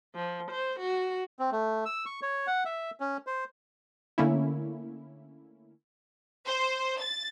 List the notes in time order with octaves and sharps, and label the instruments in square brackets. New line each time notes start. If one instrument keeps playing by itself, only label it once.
[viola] F3
C5
F#4
[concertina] C4
A3
E6
C#6
C#5
F#5
E5
C#4
C5
[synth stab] D3 A3 A#3 C#4 E4
[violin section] C5
A6